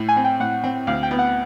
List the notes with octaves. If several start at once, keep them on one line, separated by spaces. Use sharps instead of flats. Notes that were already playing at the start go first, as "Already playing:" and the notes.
Already playing: A2
G#5
C4
G5
A2 F#5
C4
D2 F5
G5
B3
F#5